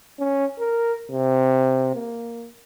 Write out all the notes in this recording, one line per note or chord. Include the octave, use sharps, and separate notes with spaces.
C#4
A#4
C3
A#3